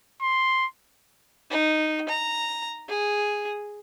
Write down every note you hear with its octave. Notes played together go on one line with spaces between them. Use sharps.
C6
D#4
A#5
G#4